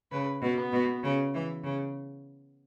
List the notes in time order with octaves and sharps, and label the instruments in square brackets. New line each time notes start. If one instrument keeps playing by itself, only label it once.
[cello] C#3 [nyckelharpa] B4
[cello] B2
[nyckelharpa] B3
[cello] B2
C#3
E3
C#3